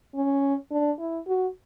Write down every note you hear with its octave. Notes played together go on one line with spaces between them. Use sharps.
C#4
D4
E4
F#4